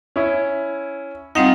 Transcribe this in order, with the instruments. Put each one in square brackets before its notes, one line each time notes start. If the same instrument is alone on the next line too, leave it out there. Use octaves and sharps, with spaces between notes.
[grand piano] C#4 E4
[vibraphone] G3 C4 F#5 [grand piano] D#4 F4